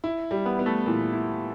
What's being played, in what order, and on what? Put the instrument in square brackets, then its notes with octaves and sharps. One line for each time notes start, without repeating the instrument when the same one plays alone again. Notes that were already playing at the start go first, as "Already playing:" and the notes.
[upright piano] E4
G3
[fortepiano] B3
[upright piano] B3
[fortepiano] A3
[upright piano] A#2 [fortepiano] E3
[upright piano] E4